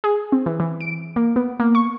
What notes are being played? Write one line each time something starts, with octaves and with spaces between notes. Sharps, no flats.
G#4
C4
E3
E3
D7
A#3
B3
A#3
C#6